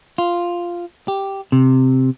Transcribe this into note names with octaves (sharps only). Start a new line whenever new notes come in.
F4
G4
C3